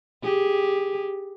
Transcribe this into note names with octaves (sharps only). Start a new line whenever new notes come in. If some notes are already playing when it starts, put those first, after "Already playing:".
G4 G#4